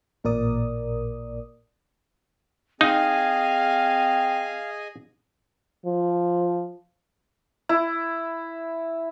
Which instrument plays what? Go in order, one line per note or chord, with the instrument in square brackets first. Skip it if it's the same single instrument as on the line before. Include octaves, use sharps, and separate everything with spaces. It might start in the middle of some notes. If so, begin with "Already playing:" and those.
[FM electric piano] A1 A#2 A#4 D5 D#6
[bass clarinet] C4 [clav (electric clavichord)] D#4 [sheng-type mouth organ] G#4 D#5 G#5 [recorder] F5
[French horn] F3
[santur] E4